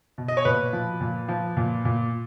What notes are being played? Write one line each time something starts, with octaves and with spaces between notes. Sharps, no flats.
B2
D#5
C#5
A#2 B4
F3
A#2
F3
A#2
A#2